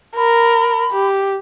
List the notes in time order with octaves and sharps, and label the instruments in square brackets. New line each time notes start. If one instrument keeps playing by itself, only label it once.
[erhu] A#4 [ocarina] B5
[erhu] G4